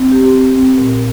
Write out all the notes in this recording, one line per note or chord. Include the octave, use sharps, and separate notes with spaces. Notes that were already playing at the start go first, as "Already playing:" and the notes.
Already playing: C4
G4
C4
C4
A#2